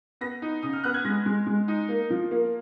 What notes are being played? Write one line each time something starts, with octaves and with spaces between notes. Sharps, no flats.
B3 A#6
D#4
C#3 D#6
F6
B3 F#6
G#6
G#3 A#6
G#3
G#3
D#4
A#3
F3
A#3